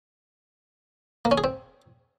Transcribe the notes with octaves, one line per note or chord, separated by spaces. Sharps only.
A#3
C#4
G#4
C4